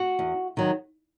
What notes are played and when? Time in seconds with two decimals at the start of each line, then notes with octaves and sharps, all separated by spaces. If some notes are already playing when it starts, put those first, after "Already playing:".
Already playing: F#4
0.19 E2
0.57 D#3 F#3